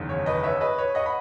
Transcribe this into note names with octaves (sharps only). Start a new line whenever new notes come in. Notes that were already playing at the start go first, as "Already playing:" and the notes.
Already playing: F#1 E2 D#3
C#5
B4 D#5
C#5 E5
B4 D#5
C#5
D#5 F#5
B5